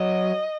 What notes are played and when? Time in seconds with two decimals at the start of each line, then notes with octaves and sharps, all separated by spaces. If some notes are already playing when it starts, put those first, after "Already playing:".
Already playing: F#3 D#5